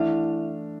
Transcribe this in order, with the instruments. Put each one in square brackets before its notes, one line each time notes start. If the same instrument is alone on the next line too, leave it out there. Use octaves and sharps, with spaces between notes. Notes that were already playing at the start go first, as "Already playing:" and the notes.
Already playing: [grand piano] E3 A3 D4 [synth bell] E4 E5